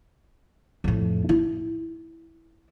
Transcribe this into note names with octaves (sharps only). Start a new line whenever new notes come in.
F2 A2
E4